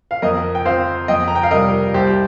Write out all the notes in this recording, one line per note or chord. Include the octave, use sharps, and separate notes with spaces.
F5
F2 A#4 D#5
G5
F3 C4 C5 F5
F2 D#5 G5
A#5
G5
F5
C3 G3 A#4 D#5
C2 G4 C5